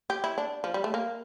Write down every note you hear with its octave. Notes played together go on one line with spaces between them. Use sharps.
G4
E4
D4
F3
G3
A3
A#3